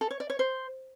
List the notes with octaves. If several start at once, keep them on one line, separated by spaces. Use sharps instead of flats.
A4
C#5
D5
C#5
C5